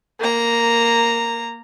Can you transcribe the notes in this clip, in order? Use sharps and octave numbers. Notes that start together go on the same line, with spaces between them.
A#3 A#5